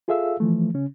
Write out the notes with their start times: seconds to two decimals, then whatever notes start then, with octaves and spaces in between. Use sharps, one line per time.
0.08 F4 G#4 A4 E5 F5 E6
0.40 E3 F3 A3
0.74 C#3 C#4